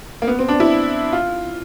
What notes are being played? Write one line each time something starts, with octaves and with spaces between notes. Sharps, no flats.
A#3
B3
C4
D4
E4
F4